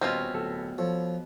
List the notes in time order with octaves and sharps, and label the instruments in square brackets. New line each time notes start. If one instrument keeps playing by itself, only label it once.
[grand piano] D#1 [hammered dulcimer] B2 [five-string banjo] C4 C#4 F4
[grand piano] D1 A4
[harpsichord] F3 [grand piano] A4 C#5